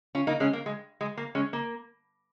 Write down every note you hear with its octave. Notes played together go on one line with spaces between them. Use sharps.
C#4 F4
A#3 D#4
G#3 C#4
A#3
G#3
G#3
A#3
G#3 C#4
A#3